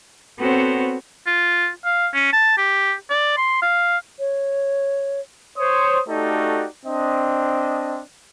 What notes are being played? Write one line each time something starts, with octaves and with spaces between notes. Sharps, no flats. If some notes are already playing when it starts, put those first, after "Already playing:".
B3 C4 F#4 A4 C5 C#5
F4
F5
C#4
A5
G4
D5
C6
F5
C#5
C5 C#5 D#6
A3 D#4 F#4 G4 A4 D5
C4 D4 D#5